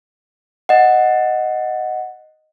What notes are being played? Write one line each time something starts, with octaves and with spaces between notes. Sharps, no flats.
D#5 F#5